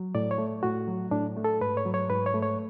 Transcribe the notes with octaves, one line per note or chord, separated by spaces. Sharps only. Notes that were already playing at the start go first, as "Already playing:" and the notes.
Already playing: F#3
A2 D5
C#5
A3
A2 F#4
F#3
A2 D4
A3
A4
G#2 B4
C#5
F#3
C#5
G#2 B4
C#5
A3
C#5